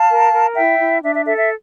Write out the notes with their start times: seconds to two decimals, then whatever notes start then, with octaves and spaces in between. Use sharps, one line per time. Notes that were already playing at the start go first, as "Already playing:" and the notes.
Already playing: F5 A5
0.09 A#4
0.33 A#4
0.55 E4 E5 G5
0.79 E4
1.02 D4 E5
1.14 E5
1.25 A4 E5
1.37 E5